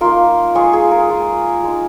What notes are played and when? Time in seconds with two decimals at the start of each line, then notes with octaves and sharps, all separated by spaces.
0.01 A#3 D#4 F4 A#4
0.55 G#3 F4 G#4 C#5
0.73 G#4
0.91 F4 A#4
1.10 G#3 F4
1.64 G#3 D#4